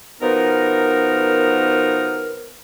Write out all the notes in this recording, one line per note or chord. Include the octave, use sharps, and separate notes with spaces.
B2 F3 B3 D#4 A#4